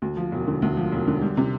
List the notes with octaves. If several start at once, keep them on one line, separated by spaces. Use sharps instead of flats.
D2
F3
E1
D3
D2
F3
E1
D3
G3
C3